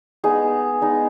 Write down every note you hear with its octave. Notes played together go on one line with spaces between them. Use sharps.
G#3 B3 D#4 G#4
G#3 B3 D#4